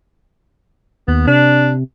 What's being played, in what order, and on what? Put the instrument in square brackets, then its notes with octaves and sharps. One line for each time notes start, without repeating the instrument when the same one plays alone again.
[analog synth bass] D#2 [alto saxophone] B3
[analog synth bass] C3 [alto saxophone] D4